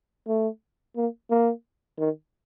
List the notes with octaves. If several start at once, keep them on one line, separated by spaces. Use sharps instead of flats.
A3
A#3
A#3
D#3